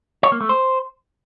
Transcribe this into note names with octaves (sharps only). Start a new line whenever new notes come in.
C#5
A#3
A3
C5